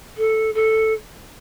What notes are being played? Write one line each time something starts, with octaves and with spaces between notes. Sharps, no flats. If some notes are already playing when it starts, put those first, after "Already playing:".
A4
A4